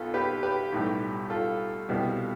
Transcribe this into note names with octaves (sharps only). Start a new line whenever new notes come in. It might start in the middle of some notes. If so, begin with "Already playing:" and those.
Already playing: B1 B2 B3 F4 A4
G4 B4
G4 B4
B1 A2 G3
F4 A4
C2 B2 G3 B3